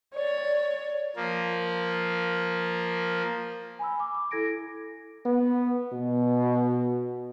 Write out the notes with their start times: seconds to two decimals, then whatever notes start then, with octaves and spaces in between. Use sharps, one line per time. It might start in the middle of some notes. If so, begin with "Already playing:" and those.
0.15 C#5 D5
1.16 F3 A#3
3.79 G#5 B5 E6
4.00 D6
4.15 D6
4.31 E4 A4 G#6 A#6 D7
5.25 B3
5.93 B2